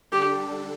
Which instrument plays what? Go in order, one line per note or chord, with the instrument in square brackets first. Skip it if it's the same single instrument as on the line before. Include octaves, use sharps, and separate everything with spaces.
[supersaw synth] D3 G3 D4 A4 [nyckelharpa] G4